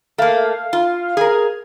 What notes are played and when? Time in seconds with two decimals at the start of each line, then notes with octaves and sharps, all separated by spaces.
0.18 A3 A#3 F5
0.73 F4
1.17 G#4 A#4